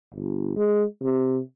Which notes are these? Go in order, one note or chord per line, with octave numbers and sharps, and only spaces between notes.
G1
G#3
C3